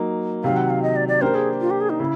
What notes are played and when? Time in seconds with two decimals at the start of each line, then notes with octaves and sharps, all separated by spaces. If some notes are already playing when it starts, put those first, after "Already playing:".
Already playing: F#3 A#3 D#4
0.44 C3 D#3 F#3 F5
0.57 F#5
0.70 F5
0.83 D#5
0.96 D5
1.08 D5
1.22 A#3 D4 G4 A#4 C5
1.35 G#4
1.61 F4
1.70 G4
1.81 G#4
1.90 D#4
2.00 C#3 E4